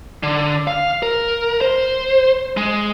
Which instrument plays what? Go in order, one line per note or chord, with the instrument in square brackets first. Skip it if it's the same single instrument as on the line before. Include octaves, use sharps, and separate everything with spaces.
[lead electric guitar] D3
F5
A#4
C5
G#3